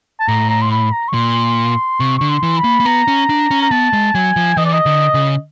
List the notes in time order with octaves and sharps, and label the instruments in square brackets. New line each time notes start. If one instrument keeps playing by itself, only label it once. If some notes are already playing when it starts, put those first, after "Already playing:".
[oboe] A5
[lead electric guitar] A2 [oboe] A#5
[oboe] A#5
C6
B5
A#5
C#6
[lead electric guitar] A#2 [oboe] C6
[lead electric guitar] C3 [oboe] C#6
[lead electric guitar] D3 [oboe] C#6
[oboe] C6
[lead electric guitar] E3
[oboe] B5
[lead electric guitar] A#3
A#3
[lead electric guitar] B3 [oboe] A#5
[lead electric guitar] C#4
D4
C#4
[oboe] A#5
[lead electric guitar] B3 [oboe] A5
[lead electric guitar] G#3
[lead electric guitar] F#3 [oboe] G#5
[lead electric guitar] F3
[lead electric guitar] E3 [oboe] D#5
[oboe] D5
D#5
[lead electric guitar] D3
C#3